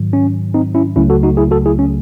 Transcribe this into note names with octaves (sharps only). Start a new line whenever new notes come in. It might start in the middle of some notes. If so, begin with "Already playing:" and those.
Already playing: G#2 D#3 F#3
C#4
C4 D#4
C#4 E4
C#2 C#3 F#3 A3 C#4 E4
F#4 A4
D#4 F#4
E4 G#4
F#4 A4
E4 G#4
C#4